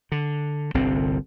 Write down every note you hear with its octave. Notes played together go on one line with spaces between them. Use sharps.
D3
G1 C2 D3 C4